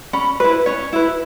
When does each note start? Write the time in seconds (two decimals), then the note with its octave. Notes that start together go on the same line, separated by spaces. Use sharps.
0.13 C#4 B5
0.40 E4 B4
0.66 C#4 C#5
0.93 E4 B4